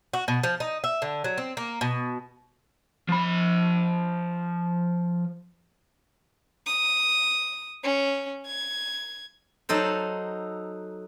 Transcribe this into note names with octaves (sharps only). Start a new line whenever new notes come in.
F#4
B2
F3
D#4
E5
D3
F#3
C4
A#3
B2
F3 B5
D#6
C#4
G#6
F#3 D#4 A4 C5